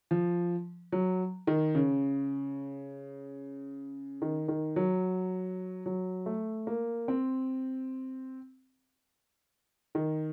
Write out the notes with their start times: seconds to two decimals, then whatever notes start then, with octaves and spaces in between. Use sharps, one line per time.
0.11 F3
0.92 F#3
1.47 D#3
1.75 C#3
4.22 D#3
4.48 D#3
4.76 F#3
5.86 F#3
6.26 A3
6.67 A#3
7.08 C4
9.95 D#3